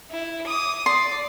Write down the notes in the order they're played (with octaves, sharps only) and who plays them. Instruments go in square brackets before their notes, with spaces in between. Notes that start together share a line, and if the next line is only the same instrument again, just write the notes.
[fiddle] E4
D6 D#6
[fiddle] D5 [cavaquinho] C6